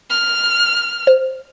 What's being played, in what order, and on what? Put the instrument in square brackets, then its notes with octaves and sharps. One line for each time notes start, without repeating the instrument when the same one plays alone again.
[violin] F6
[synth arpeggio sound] C5